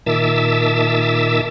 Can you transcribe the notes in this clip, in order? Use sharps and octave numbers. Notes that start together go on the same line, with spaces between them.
A#2 D#3 E5 A5 D6 E6